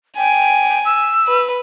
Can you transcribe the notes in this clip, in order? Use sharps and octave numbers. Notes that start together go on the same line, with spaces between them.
G5 G#5
E6
B4